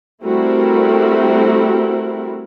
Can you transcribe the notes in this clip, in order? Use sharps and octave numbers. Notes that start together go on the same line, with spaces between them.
G3 A3 C4 E4 F#4 A#4